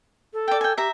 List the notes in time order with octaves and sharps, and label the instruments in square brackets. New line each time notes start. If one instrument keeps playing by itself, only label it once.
[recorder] A4
[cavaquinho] D5 G5
G5 G#5
[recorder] G4 [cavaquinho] E5 A#5